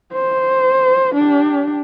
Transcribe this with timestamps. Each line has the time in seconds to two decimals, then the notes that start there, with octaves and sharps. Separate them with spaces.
0.14 C5
1.15 D4 G4